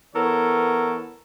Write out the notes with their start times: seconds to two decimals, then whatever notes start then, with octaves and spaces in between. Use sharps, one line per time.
0.15 E3 B3 A4 A#4 C#5